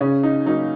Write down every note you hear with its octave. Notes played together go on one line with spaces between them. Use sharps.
C#3 C#4
D#4
F#3 A#3 D#4